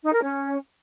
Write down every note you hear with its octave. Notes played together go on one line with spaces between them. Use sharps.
D#4
A#4
C#4